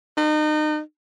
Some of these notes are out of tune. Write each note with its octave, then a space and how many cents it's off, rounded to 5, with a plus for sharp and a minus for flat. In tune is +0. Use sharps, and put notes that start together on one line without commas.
D#4 -30